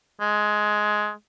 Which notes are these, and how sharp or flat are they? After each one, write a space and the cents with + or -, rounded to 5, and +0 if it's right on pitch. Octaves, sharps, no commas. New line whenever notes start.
G#3 +15